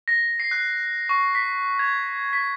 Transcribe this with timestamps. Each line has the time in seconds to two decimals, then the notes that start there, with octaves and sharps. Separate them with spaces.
0.08 A#6
0.40 C7
0.51 F#6
1.09 C#6
1.35 B6
1.79 G#6
2.33 B6